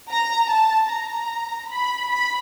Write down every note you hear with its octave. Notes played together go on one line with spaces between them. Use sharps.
A#5
A5
A#5
B5
B5